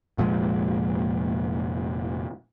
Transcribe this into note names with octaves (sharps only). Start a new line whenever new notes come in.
F1 A#2 F3 G#3